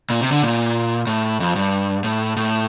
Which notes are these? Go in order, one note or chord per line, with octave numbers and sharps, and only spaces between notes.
A#2
C3
D3
A#2
A2
F2
G2
A2
A2